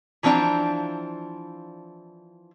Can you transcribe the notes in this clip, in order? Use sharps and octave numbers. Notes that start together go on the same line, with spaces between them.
E3 F3 C4 D4 A#5